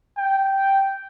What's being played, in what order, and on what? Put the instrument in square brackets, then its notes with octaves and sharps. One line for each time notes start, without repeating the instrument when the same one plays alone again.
[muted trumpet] G5